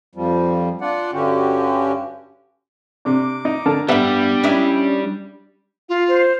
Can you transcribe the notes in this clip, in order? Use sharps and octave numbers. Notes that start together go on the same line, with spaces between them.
F2 F3 G3
D4 F4 D5 F#5
G2 D3 C#4 F#4 G4
C3 D4 D6
D#4
D3 A#4 A5
G2 G3 B3 B4 E5 F#5
C#4 D4 E4 D#5
F4
C5